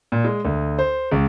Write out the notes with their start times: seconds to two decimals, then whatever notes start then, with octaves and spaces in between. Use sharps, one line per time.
0.12 A#2
0.25 G#3
0.45 D2
0.79 C5
1.11 C#2